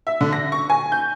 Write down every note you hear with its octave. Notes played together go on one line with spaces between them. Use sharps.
E5
D3
A#6
C#6
G#5
G6